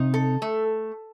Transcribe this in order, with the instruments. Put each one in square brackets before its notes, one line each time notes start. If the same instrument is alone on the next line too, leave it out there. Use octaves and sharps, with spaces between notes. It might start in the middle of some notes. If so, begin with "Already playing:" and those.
Already playing: [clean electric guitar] C3 [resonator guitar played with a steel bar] D#4
[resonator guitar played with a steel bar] A4
A3